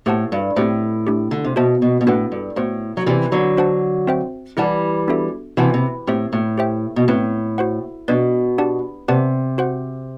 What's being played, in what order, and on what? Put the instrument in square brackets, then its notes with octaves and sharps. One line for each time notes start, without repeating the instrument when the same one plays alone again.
[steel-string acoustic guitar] A2 [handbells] G4 C5 F#5 A5
[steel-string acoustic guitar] G2
[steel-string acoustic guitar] A2 [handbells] C4 G4 C5
[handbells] A3 D4 G4
[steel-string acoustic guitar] D3
C3
[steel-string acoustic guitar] B2 [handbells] F#4 C5 E5 A5
[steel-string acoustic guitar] B2
B2
[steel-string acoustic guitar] A2 [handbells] D4 F#4 B4 F#5
[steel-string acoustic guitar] G2
[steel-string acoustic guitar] A2 [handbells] B3 F#4 C5
[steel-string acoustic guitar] F#3
[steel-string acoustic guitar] C3 E3 [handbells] C4 G4 D5
[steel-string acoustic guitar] D3 F#3
[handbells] D4 F#4 C5 F#5 A5
C4 F#4 C5 E5 G5
[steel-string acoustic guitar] E3 G3 [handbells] E4 G4 D5 F#5 A5
[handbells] B3 D4 F#4 A4 E5
[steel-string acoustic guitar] C3 E3 [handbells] F#4 C5 F#5 A5
[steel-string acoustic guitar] C3
[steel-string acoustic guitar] A2 [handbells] C4 G4 C5 E5
[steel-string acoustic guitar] A2
[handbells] G4 C5 E5 G5
[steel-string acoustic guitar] B2
[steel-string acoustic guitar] A2 [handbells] C4 E4 B4
[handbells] F#4 C5 F#5
[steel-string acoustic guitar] B2 [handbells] D4 F#4 B4 D5
[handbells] D4 G4 D5 F#5 A5
[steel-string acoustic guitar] C3 [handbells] G4 B4 D5 F#5 A5
[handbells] F#4 C5 F#5